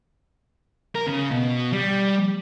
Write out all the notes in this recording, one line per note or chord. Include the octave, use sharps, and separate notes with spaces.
A#4
C#3
B2
G3